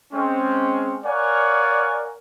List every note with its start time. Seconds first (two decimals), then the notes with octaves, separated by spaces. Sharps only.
0.13 G#3 C4 C#4
1.04 A#4 C#5 D5 F5 F#5 G#5